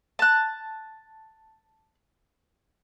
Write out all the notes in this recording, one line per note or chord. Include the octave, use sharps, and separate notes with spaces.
A5 F#6